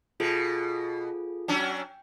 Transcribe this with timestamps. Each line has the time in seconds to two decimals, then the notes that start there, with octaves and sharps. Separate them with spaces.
0.20 B2 F4 G#4 A4
1.48 F#3 C#4 D4 G5